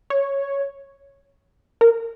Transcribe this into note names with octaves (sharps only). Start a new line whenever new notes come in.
C#5
A#4